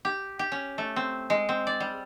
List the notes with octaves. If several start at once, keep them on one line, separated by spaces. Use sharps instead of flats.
G4
G4
C#4
A3
C4
G#3
C4
D5
G3